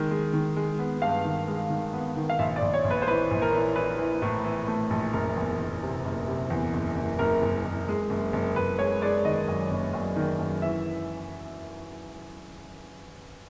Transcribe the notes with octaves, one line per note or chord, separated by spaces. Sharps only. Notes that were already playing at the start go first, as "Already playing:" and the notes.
Already playing: D#3 G#3
G#3
D#3
G#3
B3
G2 F5
D#3
G#3
D#3
B3
D#3
F5
A#1 E5
D5
A#1
C#5
A#1
B4
C5
E3 B4
A#1
A#4
E3
E3 B4
E3
A2
E3
A3
A#1
F#1 A#4
E2
F#1
C3
F#1
C3
E2
F#1
F#1
F#1 A#4
F#1
F#1
G#3
F#1
F#1
F#1 B4
G#3 C#5
G#3 D5
D#3 D#5
F#2
F#1
F#2
D#3
F#2
E3 E5